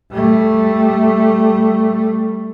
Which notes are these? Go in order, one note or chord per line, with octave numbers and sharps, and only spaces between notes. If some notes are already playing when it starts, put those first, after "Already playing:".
G3 A3